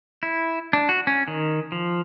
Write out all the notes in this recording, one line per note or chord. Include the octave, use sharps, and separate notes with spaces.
E4
D4
F#4
C#4
D#3
F3